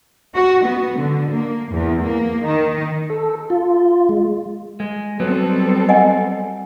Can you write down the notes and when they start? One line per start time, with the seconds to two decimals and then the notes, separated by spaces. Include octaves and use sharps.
0.35 F#4
0.65 B3
0.96 D3
1.31 A#3
1.71 E2
2.04 A#3
2.44 D#3
3.10 A4
3.50 F4
4.09 G#3
4.80 G#3
5.20 F#3 G3 B3 C4 A4
5.89 D#5 F#5 G#5